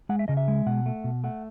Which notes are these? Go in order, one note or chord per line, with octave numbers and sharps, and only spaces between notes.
G#3 F#5
E5
C#3 D#5
E5
G#3
B2 F#5
A3
B2
A3 F#5